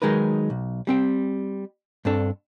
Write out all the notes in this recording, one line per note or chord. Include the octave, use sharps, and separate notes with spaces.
D#3 F#3 G#3 D#4 A#4 B4
B1
G3 C4 G5
G2 C4 D4 A4